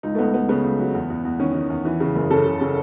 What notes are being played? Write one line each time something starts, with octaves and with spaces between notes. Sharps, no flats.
C#2 D#4
A3
C#2 B3
C#2 B3
C#3 B3
C#2
F#3
E2
E2
E2
D#3 C#4
D#3
E2
E3
C#3
F#1
C#3 A4
C#3
C#3